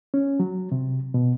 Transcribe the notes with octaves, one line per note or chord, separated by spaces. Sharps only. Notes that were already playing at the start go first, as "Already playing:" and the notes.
C#4
F#3
C3
B2